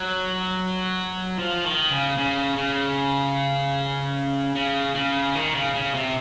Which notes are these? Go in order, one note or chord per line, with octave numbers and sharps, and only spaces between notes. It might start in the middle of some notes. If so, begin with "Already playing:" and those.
Already playing: F#3
F3
D#3
C#3
C#3
C#3
C#3
C#3
D#3
C#3
C#3
C3